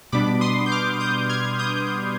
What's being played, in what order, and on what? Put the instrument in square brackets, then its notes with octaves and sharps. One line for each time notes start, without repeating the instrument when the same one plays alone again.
[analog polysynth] B2 G3 B3 D4 B5 D6
C6 D#6
G6
D6 F6
D#6 G6
F6 G#6
D#6 G6